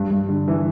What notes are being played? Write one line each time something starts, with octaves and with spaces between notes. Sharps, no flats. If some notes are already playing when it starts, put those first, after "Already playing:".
Already playing: G2
G2
D3
E3